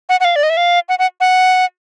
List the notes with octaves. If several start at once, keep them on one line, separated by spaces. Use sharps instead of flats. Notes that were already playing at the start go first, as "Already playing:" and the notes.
F#5
F#5
F5
D5
D#5
E5
F5
F#5
F#5
F#5